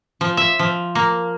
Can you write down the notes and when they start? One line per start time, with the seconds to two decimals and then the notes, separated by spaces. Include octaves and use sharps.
0.21 F3
0.37 E5
0.59 F3
0.95 A#3